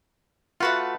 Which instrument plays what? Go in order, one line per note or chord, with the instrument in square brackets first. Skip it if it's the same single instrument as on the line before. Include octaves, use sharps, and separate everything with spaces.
[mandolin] A3 B4 F#5 [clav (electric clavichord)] F4 F#4